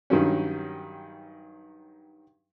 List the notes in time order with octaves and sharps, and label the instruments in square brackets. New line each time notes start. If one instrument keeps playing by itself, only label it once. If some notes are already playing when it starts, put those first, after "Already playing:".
[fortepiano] G2 D#3 F#3 C#4